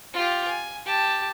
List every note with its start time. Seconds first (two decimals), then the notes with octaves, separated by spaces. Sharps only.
0.14 F4 G4
0.48 G#5
0.86 G4 A5